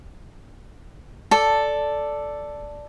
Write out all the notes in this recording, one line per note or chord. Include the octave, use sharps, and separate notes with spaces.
A4 D5